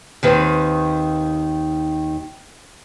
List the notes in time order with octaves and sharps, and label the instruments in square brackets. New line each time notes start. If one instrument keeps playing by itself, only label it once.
[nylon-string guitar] D#2 D#3 C4 B4